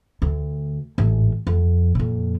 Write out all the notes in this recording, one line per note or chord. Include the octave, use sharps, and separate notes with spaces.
D2
A1 G#2
F2
F2 A#2